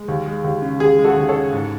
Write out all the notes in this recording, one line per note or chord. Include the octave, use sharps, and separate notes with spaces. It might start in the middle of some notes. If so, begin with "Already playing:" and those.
Already playing: G#3
D#2
G#3
D#2
C#3
D#2 G#4
G#3
F#4 A4
D#2
A4 C#5
C#3
G#2